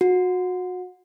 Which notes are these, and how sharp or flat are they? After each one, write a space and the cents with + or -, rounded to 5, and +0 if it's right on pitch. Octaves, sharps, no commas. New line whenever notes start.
F#4 -25